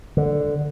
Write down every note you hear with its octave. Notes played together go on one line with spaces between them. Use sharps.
D3